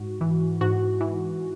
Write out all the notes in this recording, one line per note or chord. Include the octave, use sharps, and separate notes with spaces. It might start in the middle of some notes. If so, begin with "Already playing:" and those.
Already playing: G#2 F#4
E3
G#2 F#4
E3